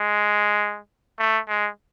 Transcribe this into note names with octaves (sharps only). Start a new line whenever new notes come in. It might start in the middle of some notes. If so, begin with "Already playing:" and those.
Already playing: G#3
A3
G#3